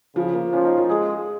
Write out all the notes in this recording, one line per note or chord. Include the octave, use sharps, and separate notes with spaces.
C#3 F3
A#3
F3 C#4
D#4
F4
G#3 G#4